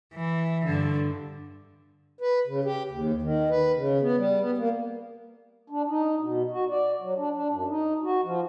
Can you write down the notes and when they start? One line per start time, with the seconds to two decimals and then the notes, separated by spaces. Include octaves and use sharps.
0.15 E3
0.65 G2 D3
2.21 B4
2.47 C#3
2.65 G4
2.92 D#2
3.22 D#3
3.50 B4
3.76 C#3
4.01 B3
4.17 G3
4.41 B3
4.58 A#3
5.70 D4
5.88 D#4
6.20 B2
6.51 F#4
6.69 D5
7.01 F#3
7.18 D4
7.34 D4
7.50 F#2
7.69 D#4
8.03 F#4
8.24 F3